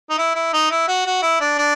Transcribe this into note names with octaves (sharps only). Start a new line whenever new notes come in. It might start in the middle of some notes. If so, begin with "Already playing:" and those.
D#4
E4
E4
D#4
E4
F#4
F#4
E4
D4
D4